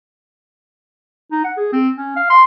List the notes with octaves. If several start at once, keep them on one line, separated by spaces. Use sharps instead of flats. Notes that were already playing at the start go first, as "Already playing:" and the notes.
D#4
F#5
G#4
C4
C#4
F5
C6